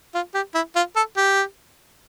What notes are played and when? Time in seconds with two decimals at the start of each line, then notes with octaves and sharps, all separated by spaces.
0.14 F4
0.34 G4
0.55 E4
0.76 F4
0.96 A4
1.17 G4